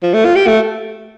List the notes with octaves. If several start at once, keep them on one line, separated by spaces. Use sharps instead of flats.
F3
A3
F4
G4
A3